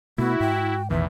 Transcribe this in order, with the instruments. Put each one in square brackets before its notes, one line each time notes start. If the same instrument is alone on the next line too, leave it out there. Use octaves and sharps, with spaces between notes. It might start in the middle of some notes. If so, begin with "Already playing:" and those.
[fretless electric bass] B2 A3 [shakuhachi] B3 [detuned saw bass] E4 [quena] F#4
[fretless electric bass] G#2 [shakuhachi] G5
[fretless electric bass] A1 B2 D#3 [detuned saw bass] E2 [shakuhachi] B4 [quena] E5